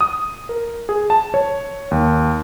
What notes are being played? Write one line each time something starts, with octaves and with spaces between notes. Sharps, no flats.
D#6
A#4
G#4
A5
C#5
D#2